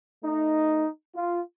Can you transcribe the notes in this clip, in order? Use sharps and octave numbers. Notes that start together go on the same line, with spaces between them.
A3 D#4
F4